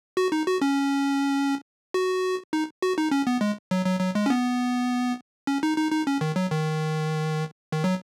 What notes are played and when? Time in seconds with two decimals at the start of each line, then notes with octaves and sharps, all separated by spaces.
0.17 F#4
0.32 D#4
0.47 F#4
0.62 C#4
1.94 F#4
2.53 D#4
2.82 F#4
2.98 D#4
3.11 C#4
3.27 B3
3.41 G#3
3.71 F#3
3.86 F#3
4.00 F#3
4.15 G#3
4.26 C#4
4.30 B3
5.47 C#4
5.63 D#4
5.77 D#4
5.92 D#4
6.07 C#4
6.21 D#3
6.36 F#3
6.51 D#3
7.72 D#3
7.84 F#3